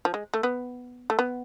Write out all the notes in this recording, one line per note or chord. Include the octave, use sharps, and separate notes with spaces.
F3
G#3
A3
B3
A3
B3